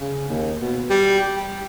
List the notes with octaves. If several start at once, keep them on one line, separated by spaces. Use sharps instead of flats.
C#3
D#2
B2
G3
G4